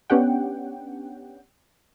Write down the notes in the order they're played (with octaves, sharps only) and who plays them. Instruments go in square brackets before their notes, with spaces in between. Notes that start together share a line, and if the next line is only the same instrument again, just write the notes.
[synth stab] B3 C#4 D4 G4 F#5 G5